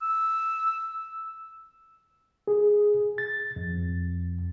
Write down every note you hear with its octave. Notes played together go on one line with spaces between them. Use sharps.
E6
G#4
A6
F2